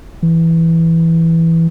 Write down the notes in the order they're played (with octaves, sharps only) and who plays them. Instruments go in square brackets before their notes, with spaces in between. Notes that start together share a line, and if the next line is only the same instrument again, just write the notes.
[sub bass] E3